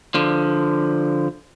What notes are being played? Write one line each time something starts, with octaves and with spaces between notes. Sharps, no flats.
D3 F3